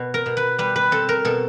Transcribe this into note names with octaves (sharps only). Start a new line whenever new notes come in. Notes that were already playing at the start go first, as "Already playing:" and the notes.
Already playing: B2
A#4
B2
B4
G3 B4
B4
C4 A4
A#4
B2 A4